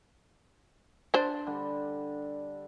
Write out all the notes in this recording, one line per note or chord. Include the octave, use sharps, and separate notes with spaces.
D4 C5
D3 G3